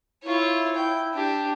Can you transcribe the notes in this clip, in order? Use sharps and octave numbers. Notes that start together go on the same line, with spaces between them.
E4 F4 C#5
G5
D4 G4